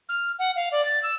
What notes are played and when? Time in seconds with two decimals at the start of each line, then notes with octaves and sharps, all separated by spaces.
0.09 F6
0.39 F#5
0.56 F5
0.72 D5
0.85 A6
1.03 E6